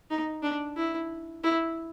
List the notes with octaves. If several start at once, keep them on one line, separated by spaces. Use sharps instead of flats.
D#4
D4
E4
E4